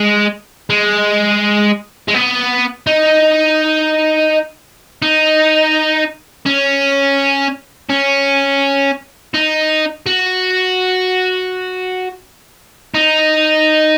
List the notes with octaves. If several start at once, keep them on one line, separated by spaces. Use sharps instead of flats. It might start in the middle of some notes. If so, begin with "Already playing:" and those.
Already playing: G#3
G#3
G#3
B3
D#4
D#4
C#4
C#4
D#4
F#4
D#4